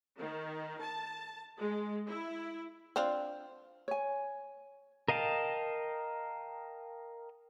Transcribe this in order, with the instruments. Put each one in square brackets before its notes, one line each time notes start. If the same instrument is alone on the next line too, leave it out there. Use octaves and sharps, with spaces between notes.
[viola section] D#3
A5
G#3
E4
[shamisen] C4 D4 F4
[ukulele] C#5 G#5
[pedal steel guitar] A#4 D#5 F5 G5 A5